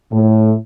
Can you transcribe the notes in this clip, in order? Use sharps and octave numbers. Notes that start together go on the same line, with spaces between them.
A2